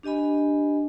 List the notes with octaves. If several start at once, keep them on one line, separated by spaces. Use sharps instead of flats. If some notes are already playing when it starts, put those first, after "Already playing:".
D4 G4 D#5 G#5 B5